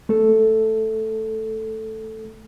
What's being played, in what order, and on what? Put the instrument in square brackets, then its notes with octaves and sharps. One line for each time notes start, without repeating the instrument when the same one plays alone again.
[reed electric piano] A3 A4